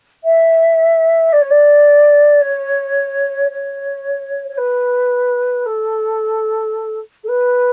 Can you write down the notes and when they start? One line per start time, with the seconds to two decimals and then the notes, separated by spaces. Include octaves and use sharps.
0.24 E5
1.32 D5
1.41 C#5
1.50 D5
2.41 C#5
3.49 C#5
4.48 C#5
4.57 B4
5.65 A4
7.23 A4
7.28 B4